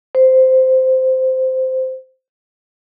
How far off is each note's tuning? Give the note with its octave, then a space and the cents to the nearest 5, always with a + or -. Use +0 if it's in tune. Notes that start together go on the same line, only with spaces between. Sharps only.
C5 -10